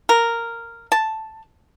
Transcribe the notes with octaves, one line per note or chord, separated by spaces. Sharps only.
A#4
A5